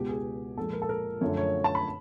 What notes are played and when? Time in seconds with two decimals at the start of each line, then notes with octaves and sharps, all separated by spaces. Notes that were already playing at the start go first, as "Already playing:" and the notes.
Already playing: C#2 B2 G#3 G4
0.09 G#4
0.57 A#2 F3 G#3 A4
0.73 A#4
0.82 A4
0.89 A#4
1.21 F#2 D3 F3 A3 C#5
1.37 C#5
1.64 A5
1.75 B5